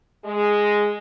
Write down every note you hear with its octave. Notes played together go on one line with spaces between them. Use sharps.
G#3